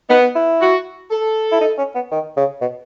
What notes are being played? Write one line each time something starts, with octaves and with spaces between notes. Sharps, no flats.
B3 D#4
E4
F#4
A4
E4
D#4
C#4
B3
D#3
C#3
B2